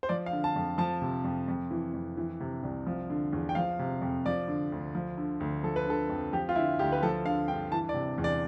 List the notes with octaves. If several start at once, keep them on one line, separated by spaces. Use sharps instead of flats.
C5
F3 D5
F5
D3
A5
F2
F3 A5
C3
F2
F2
E3
F2
E3
C3
C2
F3
D3
E2
G5
F3 F5
C3
F2
F3 D5
D3
D2
F3
D3
D2
F3 A4
B4
D3 A4
F2
F3 G4
F4
D3 E4
D2 G4
B4
F3 A4
D3 F5
G2 G5
E3 A5
D5
C3
E2
D5